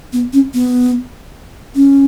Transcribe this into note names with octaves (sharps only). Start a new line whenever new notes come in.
B3
C#4
B3
C#4